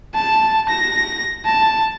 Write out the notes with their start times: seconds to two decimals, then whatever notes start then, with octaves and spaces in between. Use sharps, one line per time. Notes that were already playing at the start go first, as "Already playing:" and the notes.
0.15 A5
0.69 A#6
1.46 A5